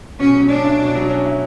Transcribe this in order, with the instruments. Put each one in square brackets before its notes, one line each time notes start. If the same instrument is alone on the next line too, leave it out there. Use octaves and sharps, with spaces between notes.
[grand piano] B2 [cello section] C#4
[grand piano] F#3
[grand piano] C#4 [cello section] D4
[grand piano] E4
B2
F#3
C#4
E4